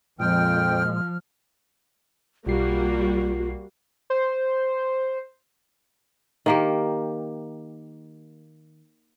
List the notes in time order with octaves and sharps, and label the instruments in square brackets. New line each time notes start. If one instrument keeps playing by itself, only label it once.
[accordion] F2 G5 [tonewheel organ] A#2 G#3 [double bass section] F3 [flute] F6
[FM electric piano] B1 C7 [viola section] G3 A#3 F#4 [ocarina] F4
[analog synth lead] C5
[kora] D#3 A#3 G4